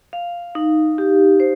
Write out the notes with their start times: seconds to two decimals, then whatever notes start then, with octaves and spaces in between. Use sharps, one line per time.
0.13 F5
0.55 D#4
0.98 G4
1.40 C5